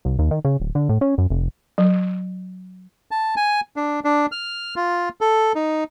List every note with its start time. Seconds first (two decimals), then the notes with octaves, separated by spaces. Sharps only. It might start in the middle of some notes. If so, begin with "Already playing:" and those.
0.05 C2
0.19 D#2
0.31 D#3
0.45 C#3
0.60 D1
0.75 D3
0.89 A2
1.01 C#4
1.18 F#2
1.30 F1
1.78 F#3
3.11 A5
3.36 G#5
3.76 D4
4.04 D4
4.32 F6
4.76 F4
5.21 A4
5.55 D#4